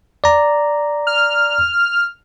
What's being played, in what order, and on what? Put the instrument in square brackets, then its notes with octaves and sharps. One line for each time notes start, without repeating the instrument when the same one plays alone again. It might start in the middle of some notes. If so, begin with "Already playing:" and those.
[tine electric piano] D5 A#5
[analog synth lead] F6